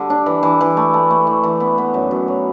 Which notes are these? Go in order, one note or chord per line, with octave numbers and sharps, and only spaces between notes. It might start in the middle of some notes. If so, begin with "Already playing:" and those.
Already playing: D3 G3
D4
E3
E3
E3
A3
A3
A3
E3
E3
B3
B3
F#2
F#2
F#3